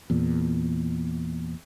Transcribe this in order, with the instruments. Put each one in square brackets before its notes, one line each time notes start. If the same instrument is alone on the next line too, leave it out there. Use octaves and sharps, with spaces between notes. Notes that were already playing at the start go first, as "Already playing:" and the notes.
[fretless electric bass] E2 A#2